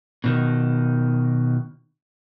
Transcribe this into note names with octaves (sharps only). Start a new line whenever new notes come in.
B2 D#3